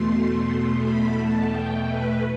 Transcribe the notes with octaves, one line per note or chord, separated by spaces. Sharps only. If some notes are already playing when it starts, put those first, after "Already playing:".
Already playing: E2 B2 A3 C6
B5
A5
G5
B4